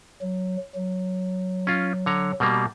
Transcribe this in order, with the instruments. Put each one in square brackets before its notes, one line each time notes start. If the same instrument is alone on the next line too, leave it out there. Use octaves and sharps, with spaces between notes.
[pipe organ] F#3
F#3
[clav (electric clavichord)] C#4 F4
D3 C#5 A#5
B2 G3 A#3